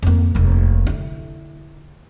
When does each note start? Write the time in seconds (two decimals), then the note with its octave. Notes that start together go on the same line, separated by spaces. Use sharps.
0.02 F2 A#3
0.35 F1 D#2
0.87 D3 E4